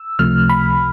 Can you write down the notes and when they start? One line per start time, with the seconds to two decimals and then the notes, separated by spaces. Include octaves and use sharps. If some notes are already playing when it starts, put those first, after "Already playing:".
Already playing: E6
0.19 C#2 C3 F3 A3 F6
0.49 B5